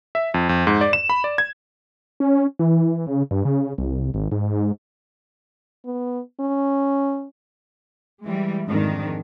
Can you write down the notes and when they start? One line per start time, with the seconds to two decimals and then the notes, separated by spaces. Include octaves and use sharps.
0.15 E5
0.34 F2
0.49 F2
0.67 G#2
0.81 D5
0.93 E7
1.09 B5
1.24 D5
1.38 G#6
2.20 C#4
2.59 E3
3.07 C#3
3.31 G2
3.45 C#3
3.78 C2
4.14 G#1
4.32 G#2
5.85 B3
6.40 C#4
8.23 E3 G3 G#3
8.67 F2 G#2 D#3 D4